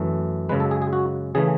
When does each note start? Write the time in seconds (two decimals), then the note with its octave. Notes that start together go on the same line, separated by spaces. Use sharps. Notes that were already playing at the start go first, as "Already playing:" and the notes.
Already playing: F#2 E3 A3
0.49 F#2 C#3 G#3 B4
0.60 A4
0.71 G#4
0.82 G#4
0.93 F#4
1.35 C#3 E3 A3 G#4